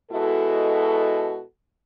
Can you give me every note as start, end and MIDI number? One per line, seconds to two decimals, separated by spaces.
0.11 1.42 47
0.11 1.42 56
0.11 1.42 64
0.11 1.42 66
0.11 1.42 69